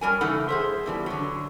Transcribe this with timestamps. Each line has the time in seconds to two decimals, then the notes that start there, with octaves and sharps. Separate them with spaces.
0.01 F#3 G3 A#4 G#5
0.21 C#3 E3 A3 D#4 A4 F#5
0.49 G#4 C5 E5
0.86 B2 E3 G3
1.06 D3 F#3